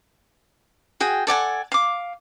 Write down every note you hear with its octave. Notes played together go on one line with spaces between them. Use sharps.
F#4 G#4 G5
A4 D5 F#5 G#5
F5 D6